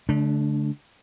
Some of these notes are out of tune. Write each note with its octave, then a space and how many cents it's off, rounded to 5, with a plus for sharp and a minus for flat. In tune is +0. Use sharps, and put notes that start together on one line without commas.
D3 -45 A3 -35 D4 +0